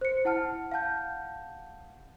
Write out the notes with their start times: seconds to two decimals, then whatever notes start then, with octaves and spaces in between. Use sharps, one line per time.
0.01 C5 C#7
0.25 E4 F#5 A5 F6
0.72 F5 F#5 A5 G6